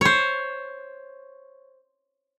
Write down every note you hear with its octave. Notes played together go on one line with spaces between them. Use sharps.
C5 C#5